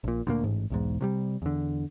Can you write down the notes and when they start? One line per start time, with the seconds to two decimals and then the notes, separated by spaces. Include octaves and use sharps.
0.04 A#1 A#2
0.27 D2 A#2 F#3 A#3
0.44 A1 G#2
0.70 B1 E2 G#2
1.01 C3 F#3 G3
1.42 E2 D3